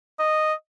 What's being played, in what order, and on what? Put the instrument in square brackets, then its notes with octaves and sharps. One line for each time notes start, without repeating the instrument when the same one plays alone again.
[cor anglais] D#5